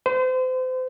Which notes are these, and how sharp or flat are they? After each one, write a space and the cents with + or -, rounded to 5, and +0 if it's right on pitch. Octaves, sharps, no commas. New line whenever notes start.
C5 -35